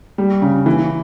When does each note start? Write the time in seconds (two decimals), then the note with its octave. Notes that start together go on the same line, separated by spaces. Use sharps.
0.18 G3
0.42 C#3
0.66 E3